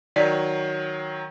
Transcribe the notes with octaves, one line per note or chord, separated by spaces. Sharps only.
D#3 F#3 C#5 D5